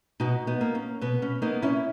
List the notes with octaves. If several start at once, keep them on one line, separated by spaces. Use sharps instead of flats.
B2 D#4 F#4
B3 D#4
A#3
C#4
B2 B3
C#4
A#3 B3 D#4
C#4 E4